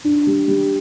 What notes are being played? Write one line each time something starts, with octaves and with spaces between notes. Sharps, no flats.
D4
G3
G3